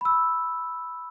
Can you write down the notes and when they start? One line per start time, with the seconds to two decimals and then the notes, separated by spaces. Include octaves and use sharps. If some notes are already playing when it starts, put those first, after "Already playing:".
0.01 B5 E6